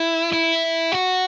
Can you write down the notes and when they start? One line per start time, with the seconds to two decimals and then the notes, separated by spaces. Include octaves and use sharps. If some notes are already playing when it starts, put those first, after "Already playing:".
Already playing: E4
0.33 E4
0.92 F#4